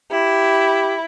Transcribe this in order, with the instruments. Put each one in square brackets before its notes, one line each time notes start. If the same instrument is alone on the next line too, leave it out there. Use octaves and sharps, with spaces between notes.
[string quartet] E4 [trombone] G4